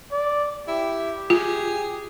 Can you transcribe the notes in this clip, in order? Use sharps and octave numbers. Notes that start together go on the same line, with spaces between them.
D5
E4 G4
F4 G#4